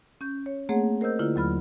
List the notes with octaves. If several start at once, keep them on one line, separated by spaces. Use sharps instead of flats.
C#4 G6
C#5
A3 A#3 C4 G#4 C#5 F#5
A#4 C5 D#5 E6 G6
D3 A#3 E4 F4
D#2 F#3 B5 F6